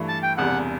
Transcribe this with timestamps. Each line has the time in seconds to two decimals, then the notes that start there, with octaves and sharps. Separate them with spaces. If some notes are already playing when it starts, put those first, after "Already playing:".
Already playing: G2 E3 A3
0.08 A5
0.23 G5
0.37 E1 E2 C3 G3 F#5